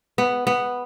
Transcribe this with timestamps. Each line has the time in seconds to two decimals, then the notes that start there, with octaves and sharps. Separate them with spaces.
0.18 B3
0.47 B3